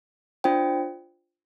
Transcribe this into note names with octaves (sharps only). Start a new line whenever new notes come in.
D4 F4 C5 G5